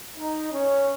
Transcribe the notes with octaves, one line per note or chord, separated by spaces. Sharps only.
D#4
C#4